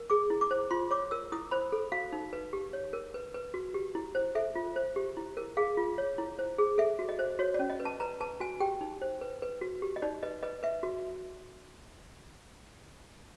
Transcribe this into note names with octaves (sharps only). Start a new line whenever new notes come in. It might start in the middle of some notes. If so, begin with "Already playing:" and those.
Already playing: A#4
G#4 D6
E4
D6
C5
F4 C6
C#5 D6
A#4 E6
E4 D#6
C5 B5
A4
F#4 F5
D#4
B4
G4
C#5
A#4
B4
B4
F#4
G4
E4
C5
A4 E5
F4
C5
G4
E4
A#4
G#4 F5
F4
C#5
E4
C5
G#4
A4 E5
F#4
D#5
C5
F#4 C#5
D5
C#4
D#5
B4
A5
B4 A#5
B4 A5
F#4 G#5
G4 G5
D#4
C5
B4
B4
F#4
G4
D#5
D#4 D5
B4 D#5
B4 D#5
B4 E5
F#4